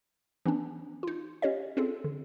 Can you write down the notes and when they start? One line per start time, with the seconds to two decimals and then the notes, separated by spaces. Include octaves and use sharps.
0.46 E3 B3 C#4 D4
1.03 D#4 F4
1.42 C#4 G4 C#5 D#5
1.77 C4 C#4 F4 G#4 A4
2.04 D3